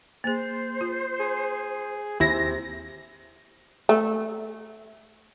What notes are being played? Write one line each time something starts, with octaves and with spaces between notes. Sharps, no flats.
A#3 G#4 C5
F4
G#4
D#2 C3 E4 G#5 A#6
A3